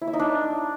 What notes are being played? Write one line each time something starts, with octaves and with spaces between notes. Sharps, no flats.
E4
E5
D#4
D4